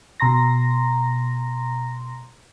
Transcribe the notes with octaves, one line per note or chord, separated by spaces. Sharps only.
B2 A#5 C6 A#6